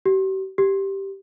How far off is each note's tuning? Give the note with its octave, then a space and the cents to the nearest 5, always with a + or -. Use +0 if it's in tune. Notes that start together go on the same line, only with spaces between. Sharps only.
G4 -40
G4 -5